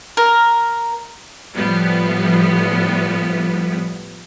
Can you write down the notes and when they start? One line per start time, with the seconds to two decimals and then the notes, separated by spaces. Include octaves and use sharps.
0.17 A#4
1.55 A2 F3 G3 B3